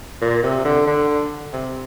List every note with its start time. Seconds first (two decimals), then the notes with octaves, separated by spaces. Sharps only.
0.21 A#2
0.43 C3
0.65 D3
0.87 D3
1.53 C3